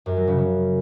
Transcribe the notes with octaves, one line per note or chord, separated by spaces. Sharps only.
F#2
F#3
C#3
C#3